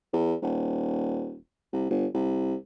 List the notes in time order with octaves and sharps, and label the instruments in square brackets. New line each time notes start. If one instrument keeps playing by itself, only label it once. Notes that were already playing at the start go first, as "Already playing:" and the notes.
[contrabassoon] E2
D#1
C2
G1
C2